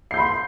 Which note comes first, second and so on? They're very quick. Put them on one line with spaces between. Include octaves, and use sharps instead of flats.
C7 G6 B5 C6